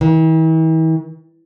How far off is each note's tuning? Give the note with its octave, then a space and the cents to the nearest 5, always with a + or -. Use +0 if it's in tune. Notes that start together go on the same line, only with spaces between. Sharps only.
E3 -45